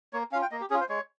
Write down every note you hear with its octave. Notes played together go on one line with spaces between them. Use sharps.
A#3 C#5
C#4 F4 F5
G5
A#3 D#5
G4
C#4 F4 G#4
C5
G#3 C#5